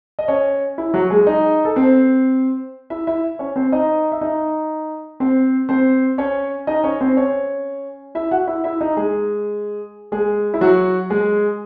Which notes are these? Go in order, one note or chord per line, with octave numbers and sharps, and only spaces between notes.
D#5
C#4 C#5
E4
F#3 F#4
G#3 G#4
D#4 D#5
A4
C4 C5
E4 E5
E4 E5
C#4 C#5
C4 C5
D#4 D#5
E5
D#4 D#5
C4 C5
C4 C5
C#4 C#5
D#4 D#5
C#4 C#5
C4 C5
C#4 C#5
E4 E5
F#4 F#5
E4 E5
E4 E5
D#4 D#5
G#3 G#4
G#3 G#4
E4
F#3 F#4
G#3 G#4